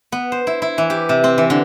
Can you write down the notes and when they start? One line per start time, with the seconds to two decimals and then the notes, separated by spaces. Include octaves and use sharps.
0.12 B3
0.32 C5
0.47 E4
0.62 E4
0.78 E3
0.90 G4
1.09 C3
1.24 C4
1.38 E3
1.50 D3